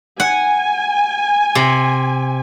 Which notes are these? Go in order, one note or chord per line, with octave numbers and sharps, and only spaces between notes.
F#5 G#5
C3